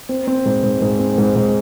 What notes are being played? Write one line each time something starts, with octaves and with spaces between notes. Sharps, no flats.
C4
C4
G#2
G#2
G#2
C4
G#2
G#2